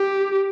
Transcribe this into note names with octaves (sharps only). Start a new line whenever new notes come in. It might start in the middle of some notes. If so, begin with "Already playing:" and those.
Already playing: G4